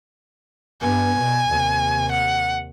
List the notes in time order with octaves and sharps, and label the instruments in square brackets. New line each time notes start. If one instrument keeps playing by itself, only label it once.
[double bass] G2 B3 [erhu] G#5
[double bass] B2
D#2 C3
[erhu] F#5